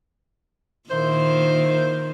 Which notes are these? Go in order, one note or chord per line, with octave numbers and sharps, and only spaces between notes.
A#2 D#3 A#3 E4 C5